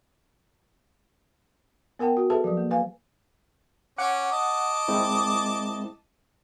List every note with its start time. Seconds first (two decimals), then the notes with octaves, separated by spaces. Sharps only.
1.99 B3 A#4 F#5 G5 A5
2.17 F#4
2.30 G#4 A4 B4 E5 A5
2.44 F3 F#3
2.57 A#3
2.71 B4 F5 G#5
3.98 C#4 F#5 D6
4.32 D#5 A5 D6
4.88 G#3 C4 E4